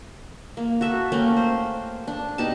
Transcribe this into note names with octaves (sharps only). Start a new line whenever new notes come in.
A#3
F#4 A4 E5
A3 A#3 C#4 G5
C5
D4
B2 D#4 G4 A5